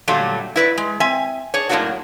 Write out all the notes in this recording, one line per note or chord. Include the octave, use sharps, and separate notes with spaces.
A#2 D3 F#3 G3 A3
E4 B4 D5
G#3
C4 E5 G#5
D4 G#4 C#5
F#2 A2 G3 A#3 D4 F#4